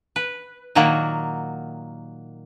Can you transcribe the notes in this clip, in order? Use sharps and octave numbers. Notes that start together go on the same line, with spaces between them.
B4
A#2 D#3 F#3 A#3 F#4